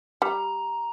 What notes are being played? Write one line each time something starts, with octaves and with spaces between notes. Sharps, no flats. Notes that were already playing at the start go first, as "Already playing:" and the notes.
G3 A#5